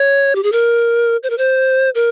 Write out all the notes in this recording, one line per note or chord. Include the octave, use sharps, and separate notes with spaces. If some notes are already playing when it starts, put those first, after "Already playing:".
Already playing: C#5
G4
G#4
A#4
C5
A#4
C5
A#4